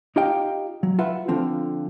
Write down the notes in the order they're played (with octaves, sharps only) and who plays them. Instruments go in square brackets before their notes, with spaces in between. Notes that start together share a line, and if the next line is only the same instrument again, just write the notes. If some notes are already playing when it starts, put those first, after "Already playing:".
[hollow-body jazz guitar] D#4 F4 G4 D#5 F5 G5
F#3
F4 B4 E5 F#5
D3 F3 C4 F4 C5